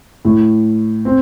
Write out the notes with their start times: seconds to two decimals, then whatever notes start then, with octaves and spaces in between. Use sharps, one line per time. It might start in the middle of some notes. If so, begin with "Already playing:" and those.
0.25 A2
1.05 C4